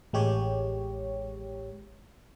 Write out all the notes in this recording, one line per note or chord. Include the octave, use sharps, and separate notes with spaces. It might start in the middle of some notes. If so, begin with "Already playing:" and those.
A1 G#3 G4 C#5